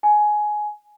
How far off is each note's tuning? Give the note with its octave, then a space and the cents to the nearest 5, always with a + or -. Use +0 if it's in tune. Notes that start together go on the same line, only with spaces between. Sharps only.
G#5 +15